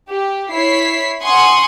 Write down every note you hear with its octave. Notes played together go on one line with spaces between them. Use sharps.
G4
E4 C#5 B6 C7
F#5 G#5 C6 C#6 D#6